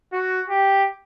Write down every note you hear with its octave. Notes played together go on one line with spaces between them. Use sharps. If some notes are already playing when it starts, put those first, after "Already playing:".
F#4
G4